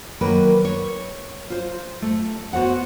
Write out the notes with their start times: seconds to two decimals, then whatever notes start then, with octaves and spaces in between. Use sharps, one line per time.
0.21 D#3 F#3 A#3 A#4 B4
0.65 C#5
1.50 F4 C5
2.02 A3
2.53 B3 F#4 C5 F#5